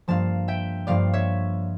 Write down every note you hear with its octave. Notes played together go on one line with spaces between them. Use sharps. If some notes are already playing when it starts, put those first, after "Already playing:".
G2 F3 A#3 F5 A5
E5 G5
G2 F3 A#3 D5 F5
C#5 E5